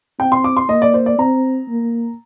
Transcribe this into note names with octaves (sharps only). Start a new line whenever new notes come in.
C4 G5
C6
D6
C6
A#3 D#5
D5
C5
D5
C4 A#5
A#3